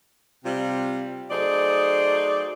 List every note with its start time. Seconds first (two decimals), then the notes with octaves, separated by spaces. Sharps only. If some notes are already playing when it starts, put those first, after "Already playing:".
0.45 C3 G3 F4
1.31 F#3 A3 D#4 G#4 C5 D5